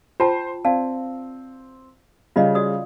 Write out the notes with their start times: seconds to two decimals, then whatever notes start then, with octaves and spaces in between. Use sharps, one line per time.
0.20 F4 C5 G5 A5
0.65 C4 D5 F5 A5
2.36 C#3 G3 F4 D#5 F5
2.55 F#4 D5 D#6